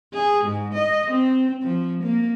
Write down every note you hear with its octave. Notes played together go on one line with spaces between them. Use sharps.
G#4
G#2
D#5
C4
F3
A#3